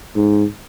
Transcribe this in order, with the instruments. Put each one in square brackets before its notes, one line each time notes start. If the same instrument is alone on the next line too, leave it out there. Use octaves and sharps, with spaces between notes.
[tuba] G#2